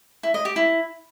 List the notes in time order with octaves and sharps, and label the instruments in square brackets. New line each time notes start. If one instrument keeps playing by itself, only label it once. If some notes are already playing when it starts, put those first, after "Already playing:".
[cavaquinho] E4
D#5
G4
E4